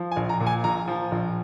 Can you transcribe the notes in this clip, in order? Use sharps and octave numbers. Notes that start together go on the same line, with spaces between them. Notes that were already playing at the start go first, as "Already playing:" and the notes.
Already playing: F3
G#5
A#1
A#5
A#2
G#5
A#1 A#5
F3
A#1